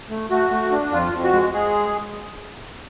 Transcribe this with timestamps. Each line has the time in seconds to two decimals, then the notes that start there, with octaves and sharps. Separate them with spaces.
0.10 A3
0.30 A3 F#4
0.50 A3
0.71 D4
0.92 F2 F4
1.13 F2
1.23 F#4
1.34 G#3
1.54 G#3 G#4